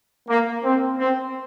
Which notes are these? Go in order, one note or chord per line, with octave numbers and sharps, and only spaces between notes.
A#3
C4
C4